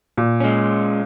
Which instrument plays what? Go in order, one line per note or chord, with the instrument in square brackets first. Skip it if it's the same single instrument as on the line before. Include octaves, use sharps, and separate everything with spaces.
[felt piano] A#2
[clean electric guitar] G#3 C#4